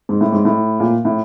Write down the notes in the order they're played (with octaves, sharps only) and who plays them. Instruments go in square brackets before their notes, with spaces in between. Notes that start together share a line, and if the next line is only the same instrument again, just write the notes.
[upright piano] G#2
A2
G#2
A2
A#2
A2